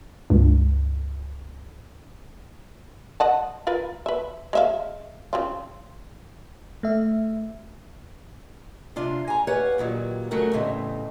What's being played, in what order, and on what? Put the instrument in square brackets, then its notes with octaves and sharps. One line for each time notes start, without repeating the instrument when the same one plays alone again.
[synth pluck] C#2 G2
[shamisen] D#5 F#5 A5
F4 A#4 B4
B4 E5
G#3 E5 F5
C#3 C4 F4
[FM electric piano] A3 E5
[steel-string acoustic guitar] C3 D4 F4
G#5 A#5
G4 B4 C#5 F5 F#5
A#2 D#3 E3 F#3 G3
C#3 F#3 A3 F#4 A#4
E2 A2 C#3 C4 D#4